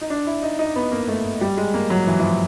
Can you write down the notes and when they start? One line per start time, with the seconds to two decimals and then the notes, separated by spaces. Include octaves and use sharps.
0.01 D#4
0.10 D4
0.27 E4
0.43 D#4
0.59 D#4
0.76 B3
0.92 A#3
1.08 A3
1.41 G3
1.57 G#3
1.74 A#3
1.90 F#3
2.07 E3
2.19 E3
2.23 F3